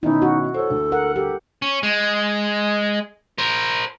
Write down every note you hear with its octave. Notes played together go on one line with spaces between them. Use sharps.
B2 D#3 C#4 D#4 E4
F#4
A4 C5 C#5
D2
A#4 F#5
G4 A4
C#4
G#3
A#4 C5